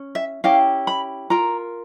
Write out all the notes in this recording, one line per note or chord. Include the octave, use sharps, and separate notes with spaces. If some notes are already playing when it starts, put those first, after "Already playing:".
Already playing: C#4
E5
C#4 E4 G4 F5
B5
F4 A#4 A#5